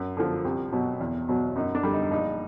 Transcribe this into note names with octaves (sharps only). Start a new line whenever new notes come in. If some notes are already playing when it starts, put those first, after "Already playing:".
Already playing: F#2
D3 F3
C2
B2 F#3
E2
B2 F#3
F#2 D#4
D4
D3 G3
D#4
A#1 D#4